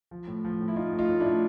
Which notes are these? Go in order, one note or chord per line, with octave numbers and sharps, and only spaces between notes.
F3
A2
F3
A2
E4
A2 D#4 F4
A2
D#4 F4
A2
D4 E4
A2